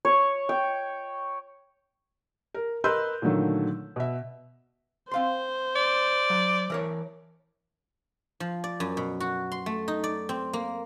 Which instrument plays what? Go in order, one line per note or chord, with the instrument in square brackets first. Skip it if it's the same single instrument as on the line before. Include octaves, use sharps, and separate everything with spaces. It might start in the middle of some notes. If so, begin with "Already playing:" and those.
[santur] C#5
G5
[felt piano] A#4
A#4 B4 D#5 C6 E6 G6
A#2 D3 D#3 F#3 A3
B2 E5
[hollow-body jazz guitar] C4 F5 C6 [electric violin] C5
[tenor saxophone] D5
[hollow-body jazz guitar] F#3
E3 A#4 C#5
[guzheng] F3
D5
F#2
B2
F#4
C6
A3
D#4
D5
C4
A#3